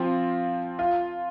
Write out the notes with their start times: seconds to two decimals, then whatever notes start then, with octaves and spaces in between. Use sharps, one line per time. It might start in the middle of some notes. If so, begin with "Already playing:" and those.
Already playing: F3 C4 F4
0.79 F4